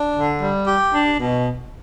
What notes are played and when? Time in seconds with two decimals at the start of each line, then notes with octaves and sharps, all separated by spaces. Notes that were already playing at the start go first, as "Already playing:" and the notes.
Already playing: D4
0.15 D3
0.40 G3
0.66 G4
0.92 D4
1.18 B2